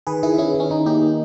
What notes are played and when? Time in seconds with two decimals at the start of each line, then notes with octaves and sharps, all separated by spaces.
0.07 D#3 G#4 B4
0.23 D#3 E4 G#4
0.38 D#3 C#4 E4
0.54 D#3
0.60 C#4
0.70 D#3 D#4
0.86 A#3 D#4 G4
1.02 A#3